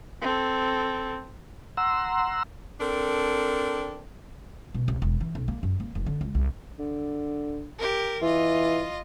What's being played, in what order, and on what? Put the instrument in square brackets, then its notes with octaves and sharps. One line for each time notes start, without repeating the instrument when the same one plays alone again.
[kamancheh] C4 A4
[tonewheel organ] F#5 A#5 C6 E6
[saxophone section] C4 D4 A4 A#4
[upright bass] B2
C2
E1
E3
B1
A#3
F#2
A#3
F1
D3
C#2
C2
[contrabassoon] D3
[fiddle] G4 A#4
[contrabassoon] E3 [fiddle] F4 D#5